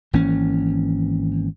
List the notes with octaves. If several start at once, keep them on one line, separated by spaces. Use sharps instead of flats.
G#1 E3 A#3 C#4